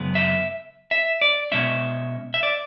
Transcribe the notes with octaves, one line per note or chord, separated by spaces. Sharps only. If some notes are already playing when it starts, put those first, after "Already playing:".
Already playing: F#2 C#3 G#3 B3
E5
E5
D5
B2 G#3 C#4 E5
E5
D5